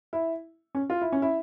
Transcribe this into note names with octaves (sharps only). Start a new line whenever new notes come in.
E4
C#4
F4
E4
C#4
E4